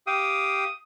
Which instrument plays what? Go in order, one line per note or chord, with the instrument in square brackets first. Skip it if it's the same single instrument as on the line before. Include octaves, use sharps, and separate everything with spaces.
[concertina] G4 F5 G5 [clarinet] D#6